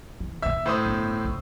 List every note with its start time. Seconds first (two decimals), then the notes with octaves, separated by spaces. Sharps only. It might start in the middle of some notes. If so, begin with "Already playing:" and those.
0.20 E3
0.42 D#2 A#2 E5 E6
0.66 A2 C5 D#6
0.85 G1
1.25 C#2